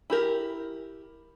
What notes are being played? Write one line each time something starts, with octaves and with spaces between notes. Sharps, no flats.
E4 G4 A#4